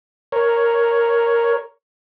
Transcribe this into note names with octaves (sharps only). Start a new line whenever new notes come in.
A#4 C#5